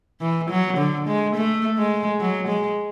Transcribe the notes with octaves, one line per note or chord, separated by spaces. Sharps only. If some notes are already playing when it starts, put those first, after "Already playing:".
E3
F#3
D3
G#3
A3
G#3
F#3
G#3